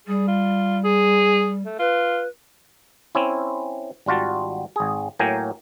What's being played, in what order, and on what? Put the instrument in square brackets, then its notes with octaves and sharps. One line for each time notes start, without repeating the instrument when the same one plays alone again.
[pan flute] G3 [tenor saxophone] G#4
[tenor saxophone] F4
G#4
A3
[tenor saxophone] F4 [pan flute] B4
[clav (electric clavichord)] C4 C#4 E4
G#1 G3 F4 F#4 A5
G#1 G#4
A2 F#3 A#3 G5 G#5 A#5